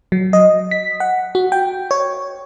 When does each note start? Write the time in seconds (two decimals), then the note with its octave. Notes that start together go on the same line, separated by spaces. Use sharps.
0.12 F#3
0.33 D#5
0.71 B6
1.00 F#5
1.35 F#4
1.52 G5
1.91 C#5